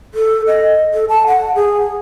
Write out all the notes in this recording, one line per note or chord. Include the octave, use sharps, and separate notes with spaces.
A4
D#5
A4
A5
F#5
G#4